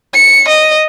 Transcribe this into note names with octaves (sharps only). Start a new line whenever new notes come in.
C#7
D#5